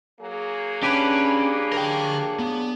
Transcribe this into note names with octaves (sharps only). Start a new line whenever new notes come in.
F#3 A#3 G#4
C#4 D4 G4 B4
A#4 G5
B3